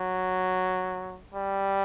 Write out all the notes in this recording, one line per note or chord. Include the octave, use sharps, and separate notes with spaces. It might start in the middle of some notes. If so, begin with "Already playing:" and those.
Already playing: F#3
G3